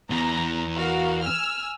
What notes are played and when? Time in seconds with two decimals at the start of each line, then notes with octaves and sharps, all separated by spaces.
0.10 E2 A#5
0.75 F#4 A#4 F5
1.22 G#5 E6 F6